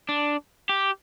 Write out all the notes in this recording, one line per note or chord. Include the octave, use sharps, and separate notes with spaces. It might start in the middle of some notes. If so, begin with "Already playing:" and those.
D4
G4